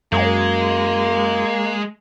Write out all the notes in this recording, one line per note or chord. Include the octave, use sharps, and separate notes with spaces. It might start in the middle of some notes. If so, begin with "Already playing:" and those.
F#2 G#3 A#3